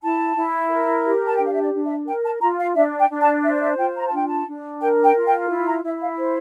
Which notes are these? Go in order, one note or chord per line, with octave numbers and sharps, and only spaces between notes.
E4 A5
E4
A#4
G4
A5
D4 G5
F5
E5
D5
D4
E5
A#4 G5
A5
F4 A#5
F5
D4 E5
G5
D4
A5
C5 E5
D5
E5
F4 G5
A#5
A5
D4 G5
A5
D4
A#4 G5
G5
F4
G5
E4
A#5
E4 E5
F5
C5